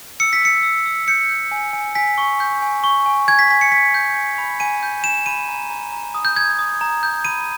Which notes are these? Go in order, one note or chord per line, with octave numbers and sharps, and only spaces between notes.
E6 C#7
B6
E6 C#7
E6
E6
G6 C#7
G6
G#5
G#5
G#5 B6
C#6
G6
G#5
C#6
G#5
G#5 G#6
B6
G#5 B6
C#7
G#5 B6
G6
G#5
B5
G#5 D#7
G6
G#5 E7
B5 D#7
A#5
A#5
A#5
D#6
G6
G6 G#6
D#6
A#5
G6
B5 D#7